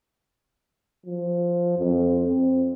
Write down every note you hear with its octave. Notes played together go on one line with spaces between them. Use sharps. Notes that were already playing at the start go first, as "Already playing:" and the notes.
F3
F2
C4